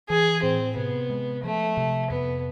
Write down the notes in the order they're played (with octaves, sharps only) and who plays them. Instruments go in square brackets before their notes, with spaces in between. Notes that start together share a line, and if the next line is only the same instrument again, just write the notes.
[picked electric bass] E3 [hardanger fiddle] G#4
[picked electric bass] A2 [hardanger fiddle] C4
[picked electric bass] C3 [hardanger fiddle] B3
[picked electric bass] G#3
[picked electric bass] F3 [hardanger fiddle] A3
[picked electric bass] C3
[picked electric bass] F2 [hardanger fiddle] B3